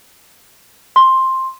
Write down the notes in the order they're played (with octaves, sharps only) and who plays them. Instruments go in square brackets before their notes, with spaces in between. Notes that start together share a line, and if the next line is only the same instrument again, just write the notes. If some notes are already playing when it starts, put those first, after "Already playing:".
[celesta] C6